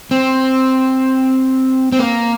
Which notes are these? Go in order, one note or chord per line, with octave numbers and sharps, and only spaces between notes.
C4
C4
A#3